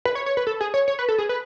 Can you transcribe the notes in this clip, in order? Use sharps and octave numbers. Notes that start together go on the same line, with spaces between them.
B4
C#5
C#5
B4
A4
G#4
C#5
C#5
B4
A4
G#4
B4